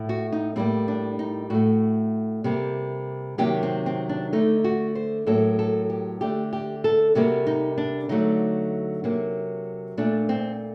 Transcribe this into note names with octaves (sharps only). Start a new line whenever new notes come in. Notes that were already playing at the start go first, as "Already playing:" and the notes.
Already playing: A2 A3
F#4
D#4
A2 G3 A#3 C4
D4
D#4
A2 A3 F#4
C3 G3 A#3
C3 D#3 F#3 A#3 G4
C4
C4
D4
D3 A3 D#4
F#4
C5
A2 F#3 A#3 A4
A4
G4
D3 A3 G4
G4
A4
C3 G3 A#3 F#4
D#4
D4
D3 F#3 A3 D#4
C3 F#3 A#3
A#2 A3 D4
C4